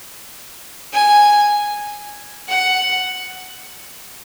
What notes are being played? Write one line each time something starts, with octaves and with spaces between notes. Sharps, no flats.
G#5
F#5